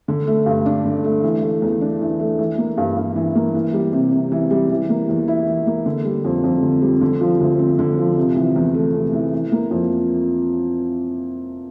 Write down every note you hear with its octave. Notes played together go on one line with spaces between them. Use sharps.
D3
A3
G2
D4
D3
A3
E3
A3
E2
D4
E3
A3
E3
A#3
G2
G2
E3
A#3
E3
G3
C3
C3
E3
G3
E3
A#3
E2
E4
E3
A#3
D3
G3
F2
F2
D3
G3
D3
F3
D2
C4
D3
F3
C3
E3
E2
A3
C3
E3
E3
A#3
F2